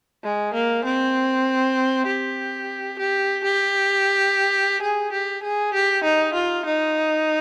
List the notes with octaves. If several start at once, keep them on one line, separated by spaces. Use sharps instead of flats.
G#3
A#3
C4
G4
G4
G4
G#4
G4
G#4
G4
D#4
F4
D#4